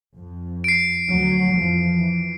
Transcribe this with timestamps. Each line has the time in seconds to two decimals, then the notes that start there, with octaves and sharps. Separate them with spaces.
0.16 F2
0.64 C7 D7
1.09 D2 F#3
1.56 F2 E3 F3
1.98 E3